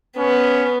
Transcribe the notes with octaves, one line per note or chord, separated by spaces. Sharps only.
B3 C#4